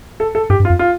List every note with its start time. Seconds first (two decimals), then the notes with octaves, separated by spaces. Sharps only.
0.20 A4
0.35 A4
0.50 G2 G4
0.60 G2
0.65 F4
0.70 F2
0.79 F4